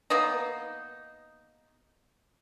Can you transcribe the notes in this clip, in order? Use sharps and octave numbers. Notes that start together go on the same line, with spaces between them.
A#3 B3 D#4